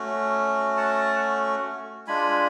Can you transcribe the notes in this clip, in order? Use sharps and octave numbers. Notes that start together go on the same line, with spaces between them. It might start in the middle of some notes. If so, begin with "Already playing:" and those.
Already playing: A3 C#4 F#4
F#5 A5
G#3 D4 F4 G#5 B5